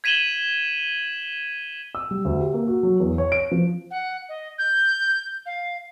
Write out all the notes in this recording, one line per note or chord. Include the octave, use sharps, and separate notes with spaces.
G#6 B6 D#7 E7 F#7 G7
E6
G3
D2
G4
A#3
F#4
F#3
E2
C#5
D7
F3
F#5
D#5
G6
F5